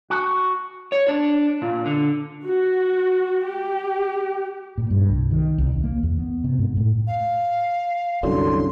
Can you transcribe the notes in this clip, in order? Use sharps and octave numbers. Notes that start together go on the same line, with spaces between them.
F#4
C#5
D4
A#2
D3
F#4
G4
A#2
G2
C2
D#3
C2
D#2
A#3
E2
B3
C3
G#2
A2
F5
C2 F#2 D3 C6